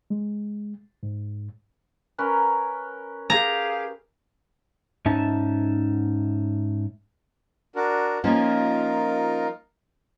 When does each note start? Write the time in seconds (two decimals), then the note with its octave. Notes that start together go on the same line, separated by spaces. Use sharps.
0.10 G#3
1.03 G#2
2.18 C#4 A#4 B4
3.30 G4 G#4 F5 A#5
5.06 G#2 C#4 D#4 E5 A5
7.76 D4 F#4 A#4
8.24 F3 A#3 C#4 D#4 F4 A#4